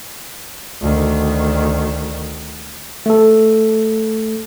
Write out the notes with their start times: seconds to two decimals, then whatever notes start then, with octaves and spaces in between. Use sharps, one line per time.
0.81 D2 D#3
3.06 A3 A4